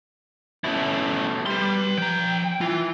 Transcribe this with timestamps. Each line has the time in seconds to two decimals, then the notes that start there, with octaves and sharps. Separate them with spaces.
0.64 B2 A3 C#4 E4
1.46 G3 B4 C6
1.98 F3 G5 A#5
2.61 E3 F4